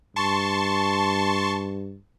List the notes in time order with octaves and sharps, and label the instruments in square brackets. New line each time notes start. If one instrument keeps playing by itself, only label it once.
[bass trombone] G2 [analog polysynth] A5 C6 C#6